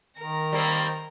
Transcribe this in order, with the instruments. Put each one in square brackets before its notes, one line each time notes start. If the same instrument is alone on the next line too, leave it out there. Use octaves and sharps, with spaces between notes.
[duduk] D#3 [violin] A#4 A#6
[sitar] G3 A#3 C4